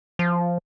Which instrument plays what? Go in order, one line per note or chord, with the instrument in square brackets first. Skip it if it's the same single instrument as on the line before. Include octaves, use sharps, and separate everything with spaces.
[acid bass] F3